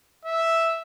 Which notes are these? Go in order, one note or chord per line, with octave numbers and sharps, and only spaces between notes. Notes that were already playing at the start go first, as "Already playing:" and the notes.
E5